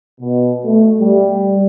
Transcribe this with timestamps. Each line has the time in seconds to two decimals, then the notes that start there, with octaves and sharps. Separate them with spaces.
0.20 B2
0.64 A3
1.00 G3